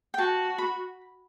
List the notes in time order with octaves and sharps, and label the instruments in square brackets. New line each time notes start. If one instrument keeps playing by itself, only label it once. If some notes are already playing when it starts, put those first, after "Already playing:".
[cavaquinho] G5
[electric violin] F#4 [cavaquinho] A5
[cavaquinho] B5